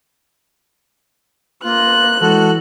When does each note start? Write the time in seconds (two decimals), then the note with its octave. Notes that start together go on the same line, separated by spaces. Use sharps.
1.64 A#3 F4 F#6
2.21 E3 G#3 F#4 A4